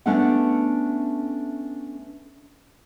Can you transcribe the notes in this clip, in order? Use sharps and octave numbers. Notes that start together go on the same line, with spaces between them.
A3 B3 C#4 D4 A4 F#5